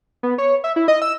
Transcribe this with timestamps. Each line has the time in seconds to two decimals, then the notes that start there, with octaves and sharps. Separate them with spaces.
0.23 B3
0.38 C#5
0.64 E5
0.76 E4
0.88 D#5
1.02 E6